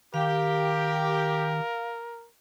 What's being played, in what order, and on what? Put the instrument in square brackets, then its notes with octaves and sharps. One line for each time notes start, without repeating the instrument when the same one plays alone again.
[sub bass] D#3 [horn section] G4 [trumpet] A#4 [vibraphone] F5